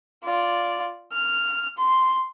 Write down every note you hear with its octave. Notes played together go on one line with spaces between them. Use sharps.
F4 D5
F6
C6